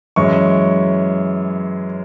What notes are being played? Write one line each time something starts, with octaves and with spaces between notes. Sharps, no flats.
F#2 E3 G#3 C#6